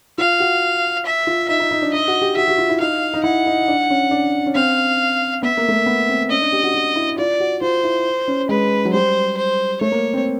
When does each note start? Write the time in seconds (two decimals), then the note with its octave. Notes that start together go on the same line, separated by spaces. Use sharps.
0.18 F4 F5
0.40 F#4
1.06 E5
1.27 F4
1.48 D#4 E5
1.60 D#4
1.71 D#4
1.82 D4
1.93 D#4 D#5
2.08 F#4
2.22 G4
2.37 F#4 E5
2.48 F#4
2.58 F4
2.69 E4
2.80 D#4 F5
3.14 D#4
3.24 E4 F#5
3.47 D#4
3.68 D4
3.90 C#4
4.11 D4
4.46 C#4
4.55 C4 F5
5.43 B3 E5
5.57 A#3
5.68 A3
5.72 A#3
5.86 B3
6.09 C4
6.31 C#4 D#5
6.41 D4
6.52 G4
6.64 F#4
6.74 F#4
6.96 E4
7.18 F4 D5
7.40 F#4
7.61 F4 C5
7.84 E4
8.28 C#4
8.49 G#3 B4
8.85 F#3
8.93 G3 C5
9.37 C5
9.81 A3 C#5
9.92 A#3
10.13 C4